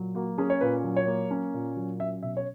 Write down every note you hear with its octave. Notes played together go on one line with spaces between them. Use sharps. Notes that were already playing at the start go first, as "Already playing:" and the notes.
Already playing: A#2 F#3
A#3 F#4
C#4 G#4
C#5
A#2 B4
F#3
C#5
A#3
C#4
A#2
F#3
C#4 E5
B2 E5
C#5